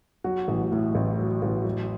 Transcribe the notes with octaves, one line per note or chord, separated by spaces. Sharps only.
F#3 F#4
A1
A2
A1
F#3
A1
F#3